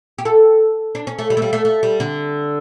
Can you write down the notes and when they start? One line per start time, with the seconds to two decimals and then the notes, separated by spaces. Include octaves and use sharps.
0.18 G4
0.25 A4
0.95 D4
1.07 C#4
1.19 A3
1.30 G3
1.37 A3
1.42 G3
1.53 A3
1.65 A3
1.83 G3
2.00 D3